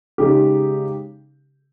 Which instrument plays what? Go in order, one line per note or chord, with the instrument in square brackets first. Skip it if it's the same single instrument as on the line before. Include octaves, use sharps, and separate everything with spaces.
[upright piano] C#3 G#3 D#4 G4